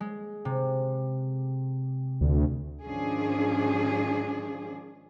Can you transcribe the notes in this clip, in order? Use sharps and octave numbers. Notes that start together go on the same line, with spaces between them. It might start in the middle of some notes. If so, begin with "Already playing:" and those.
G#3
C3
D2
G#2 D#3 F3 C#4 D4 G#4